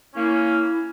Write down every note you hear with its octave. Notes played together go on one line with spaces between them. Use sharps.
A#3 C#4 E4